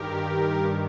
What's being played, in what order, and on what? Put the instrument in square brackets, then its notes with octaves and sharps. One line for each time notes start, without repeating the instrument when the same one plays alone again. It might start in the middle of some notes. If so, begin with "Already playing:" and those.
Already playing: [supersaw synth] G2 D#3 G4 A#4